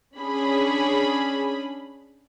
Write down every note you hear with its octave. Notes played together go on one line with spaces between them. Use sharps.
C#4 D4 G#4 B5